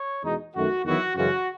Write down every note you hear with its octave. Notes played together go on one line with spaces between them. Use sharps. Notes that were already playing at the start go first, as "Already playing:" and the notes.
Already playing: C#5
E2 B2 G#3 D#4
F#2 D#3 A3 F#4
E2 D#3 F#3 B3 E4 F#4
F#2 C#3 E3 G#3 C#4 F#4